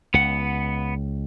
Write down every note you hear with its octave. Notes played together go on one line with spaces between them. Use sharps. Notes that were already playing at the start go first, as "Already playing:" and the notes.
C#2 B3 F#5